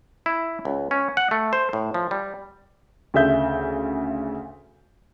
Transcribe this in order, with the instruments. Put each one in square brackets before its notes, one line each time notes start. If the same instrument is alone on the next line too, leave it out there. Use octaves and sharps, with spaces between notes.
[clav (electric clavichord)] E4
C#2
C#4
F#5
A3
C5
A2
F3
G3
[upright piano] D2 C#3 E5 G6